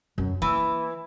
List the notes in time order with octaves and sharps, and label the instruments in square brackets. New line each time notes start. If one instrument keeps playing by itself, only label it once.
[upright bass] F#2
[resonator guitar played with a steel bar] E3 [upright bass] A#3